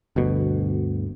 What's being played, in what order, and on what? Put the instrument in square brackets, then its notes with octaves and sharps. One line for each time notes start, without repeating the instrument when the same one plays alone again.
[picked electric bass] G1 D2 B2